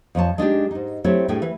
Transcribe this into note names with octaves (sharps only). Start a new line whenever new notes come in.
F2 F3 C#5 A5
G#3 D4 D#4 G4
G#2 D#4
F#3 A3 C4 E4 G4 C#5
A2 G3 A3 D4 G#4 G5
E3 B4